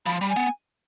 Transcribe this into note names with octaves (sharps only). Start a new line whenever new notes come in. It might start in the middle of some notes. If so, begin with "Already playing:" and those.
F3 B5
C6
G3 B5
G#5
B3